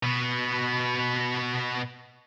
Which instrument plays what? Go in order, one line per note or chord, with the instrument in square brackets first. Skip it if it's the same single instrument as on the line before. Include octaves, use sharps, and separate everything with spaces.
[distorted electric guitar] B2 B3